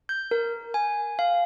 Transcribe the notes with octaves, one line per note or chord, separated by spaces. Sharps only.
G6
A#4
G#5
F5